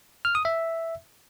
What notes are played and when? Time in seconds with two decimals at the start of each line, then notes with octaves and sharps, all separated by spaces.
0.25 F6
0.35 D#6
0.45 E5